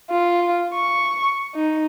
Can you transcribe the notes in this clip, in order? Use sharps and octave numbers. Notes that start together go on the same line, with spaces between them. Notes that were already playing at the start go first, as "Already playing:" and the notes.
F4
C#6
D#4